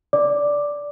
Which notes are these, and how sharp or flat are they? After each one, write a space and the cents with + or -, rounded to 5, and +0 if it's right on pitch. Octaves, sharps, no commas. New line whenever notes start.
D5 -10 D6 +5